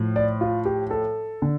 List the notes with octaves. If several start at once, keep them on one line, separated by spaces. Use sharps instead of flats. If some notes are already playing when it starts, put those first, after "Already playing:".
Already playing: A2 F3
D5
F4
G4
A4
D3